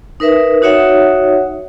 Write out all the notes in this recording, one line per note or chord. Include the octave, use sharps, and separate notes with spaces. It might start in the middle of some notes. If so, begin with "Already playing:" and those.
D#4 A#4 B4 E5
D#4 F#4 C#5 E5 F#5